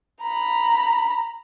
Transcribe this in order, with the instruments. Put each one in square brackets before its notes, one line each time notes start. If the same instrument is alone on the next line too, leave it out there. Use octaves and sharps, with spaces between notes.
[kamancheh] A#5 B5